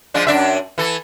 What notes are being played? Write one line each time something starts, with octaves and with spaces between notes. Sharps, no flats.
F3 G#3 D4
F#2 D4 E5
E3 A4